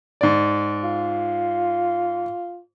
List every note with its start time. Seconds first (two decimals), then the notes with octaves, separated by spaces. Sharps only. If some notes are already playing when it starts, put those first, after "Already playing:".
0.21 G#2 D5
0.84 F4